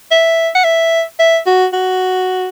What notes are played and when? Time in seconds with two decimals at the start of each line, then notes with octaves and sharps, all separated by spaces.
0.11 E5
0.55 F#5
0.64 E5
1.19 E5
1.47 F#4
1.73 F#4